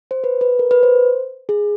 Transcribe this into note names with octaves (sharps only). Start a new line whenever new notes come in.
C5
B4
B4
A#4
B4
C5
G#4